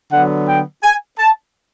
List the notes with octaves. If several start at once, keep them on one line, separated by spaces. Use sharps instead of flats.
D3 F#3 B3 F#5
G5
G#5
A5